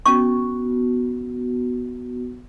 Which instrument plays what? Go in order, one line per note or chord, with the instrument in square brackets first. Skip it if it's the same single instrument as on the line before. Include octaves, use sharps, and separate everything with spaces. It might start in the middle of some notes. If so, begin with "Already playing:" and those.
[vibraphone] B3 F#4 [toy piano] C#4 C#6